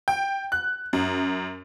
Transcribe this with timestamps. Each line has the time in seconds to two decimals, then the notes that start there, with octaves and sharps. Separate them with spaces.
0.08 G5
0.52 F#6
0.93 F#2